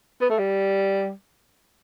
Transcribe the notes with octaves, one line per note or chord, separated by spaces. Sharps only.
B3
A3
G3